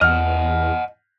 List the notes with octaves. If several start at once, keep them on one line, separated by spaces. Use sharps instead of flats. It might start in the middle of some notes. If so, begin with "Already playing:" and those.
E2 D#5 F#5 F6